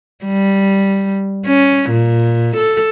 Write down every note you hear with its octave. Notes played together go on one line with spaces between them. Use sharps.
G3
C#4
A#2
A4